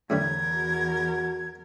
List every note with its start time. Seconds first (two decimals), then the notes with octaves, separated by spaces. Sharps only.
0.10 E2 A2 D3 G3 A#4 G#6
0.52 F#4